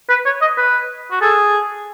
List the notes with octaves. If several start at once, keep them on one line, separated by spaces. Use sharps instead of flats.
B4
C#5
D#5
B4
F#4
G#4 A4